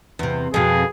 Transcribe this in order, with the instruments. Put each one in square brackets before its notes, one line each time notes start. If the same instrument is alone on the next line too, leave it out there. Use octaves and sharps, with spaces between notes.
[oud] E2 C3
[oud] F2 B2 [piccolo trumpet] G#4